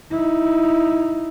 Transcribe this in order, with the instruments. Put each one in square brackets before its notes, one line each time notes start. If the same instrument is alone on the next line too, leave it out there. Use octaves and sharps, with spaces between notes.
[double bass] D#4 E4